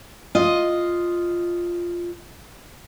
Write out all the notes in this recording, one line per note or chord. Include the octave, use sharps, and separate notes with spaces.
F4 D#5